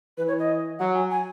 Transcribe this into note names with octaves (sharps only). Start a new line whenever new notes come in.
E3 B4
C#5
D#5
F#3 F#5
G#5
G#5